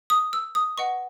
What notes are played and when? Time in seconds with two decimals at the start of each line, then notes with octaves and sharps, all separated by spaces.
0.10 D#6
0.33 E6
0.55 D#6
0.78 B4 D#5 F#5 C#6